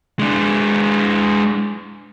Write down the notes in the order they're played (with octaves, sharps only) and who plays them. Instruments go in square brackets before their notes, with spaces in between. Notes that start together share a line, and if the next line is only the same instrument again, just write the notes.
[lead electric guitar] G#3 D4